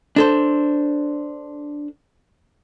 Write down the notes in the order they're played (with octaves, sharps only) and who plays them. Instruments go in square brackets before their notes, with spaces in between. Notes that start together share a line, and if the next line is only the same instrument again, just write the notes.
[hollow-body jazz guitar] D4 A4 C5